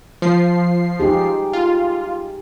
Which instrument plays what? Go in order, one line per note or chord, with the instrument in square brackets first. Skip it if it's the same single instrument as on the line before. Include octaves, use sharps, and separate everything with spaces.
[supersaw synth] F3 C7
[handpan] D#4 G4 G#4
[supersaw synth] F4